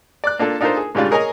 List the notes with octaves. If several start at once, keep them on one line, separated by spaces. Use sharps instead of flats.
D5 D6 F#6
A#3 D4 F4 A4
D4 D#4 F4 A4 A#4 C5
G#4
G#2 C#3 G3 D4 F4
G#4 A#4 C#5 D#5 G#5 A#5